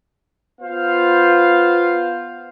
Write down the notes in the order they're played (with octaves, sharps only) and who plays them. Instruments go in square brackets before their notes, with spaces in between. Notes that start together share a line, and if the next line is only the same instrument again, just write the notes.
[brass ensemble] B3 F4 C5 F5